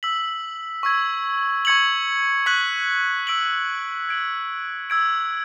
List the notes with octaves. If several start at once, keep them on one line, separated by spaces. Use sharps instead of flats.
E6 B6 F#7
C#6 E6 G#6
C#6 G#6 C#7 F#7
C#6 F#6 B6 F#7
E6 B6 D7 F#7
G#6 D7 F#7
E6 G#6 D7